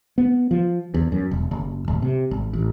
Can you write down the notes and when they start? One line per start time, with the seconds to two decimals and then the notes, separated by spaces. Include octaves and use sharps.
0.18 B3
0.51 F3
0.94 E2
1.12 F#2
1.31 E1
1.51 F#1
1.88 D1
2.02 C3
2.31 G#1
2.53 A1